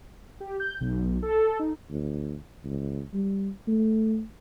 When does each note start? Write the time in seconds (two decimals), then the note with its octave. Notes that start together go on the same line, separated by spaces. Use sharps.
0.40 G4
0.60 G6
0.81 B1
1.23 A4
1.59 D#4
1.91 D2
2.65 C#2
3.14 G3
3.68 A3